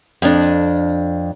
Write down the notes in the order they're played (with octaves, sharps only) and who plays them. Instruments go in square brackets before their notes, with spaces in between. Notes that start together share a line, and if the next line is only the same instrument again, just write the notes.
[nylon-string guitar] F2 D4